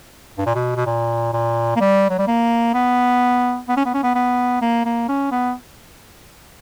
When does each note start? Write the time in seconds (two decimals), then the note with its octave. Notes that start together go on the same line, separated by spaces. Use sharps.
0.38 G2
0.46 A#2
0.55 B2
0.76 B2
0.86 A#2
1.33 A#2
1.76 A#3
1.80 G3
2.09 F#3
2.18 G3
2.27 A#3
2.74 B3
3.68 B3
3.77 C#4
3.85 B3
3.94 C#4
4.03 B3
4.15 B3
4.61 A#3
4.85 A#3
5.08 C#4
5.31 B3